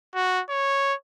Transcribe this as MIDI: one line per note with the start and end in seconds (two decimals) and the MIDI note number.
0.15 0.42 66
0.49 0.94 73